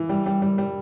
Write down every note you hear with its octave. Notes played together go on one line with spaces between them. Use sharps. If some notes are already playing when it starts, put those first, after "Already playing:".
Already playing: E3
G3
G3
G3
G3